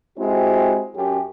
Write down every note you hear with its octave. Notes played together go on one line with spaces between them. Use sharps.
G#3 C4 E4 F#4 G4
F#2 C#4 G4